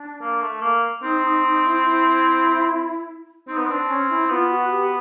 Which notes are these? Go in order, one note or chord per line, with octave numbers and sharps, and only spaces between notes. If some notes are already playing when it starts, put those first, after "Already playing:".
Already playing: D4
A#3
A3
A#3
C4 D#4
D#4
D#4
E4
E4
C4 D#4
B3
C4 D4
C#4
E4
B3 F4
F#4
G4